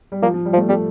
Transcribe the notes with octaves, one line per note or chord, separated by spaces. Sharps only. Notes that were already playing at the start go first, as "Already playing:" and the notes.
G3
F3 A#3
F3
G3
F3
A3
G3 A3